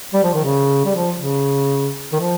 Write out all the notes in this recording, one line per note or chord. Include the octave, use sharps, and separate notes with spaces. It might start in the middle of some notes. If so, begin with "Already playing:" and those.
G3
F3
D#3
C#3
G3
F3
C#3
D#3
F3